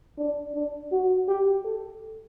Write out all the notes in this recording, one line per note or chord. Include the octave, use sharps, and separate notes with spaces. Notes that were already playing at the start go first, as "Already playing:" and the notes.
D4
D4
F#4
G4
A4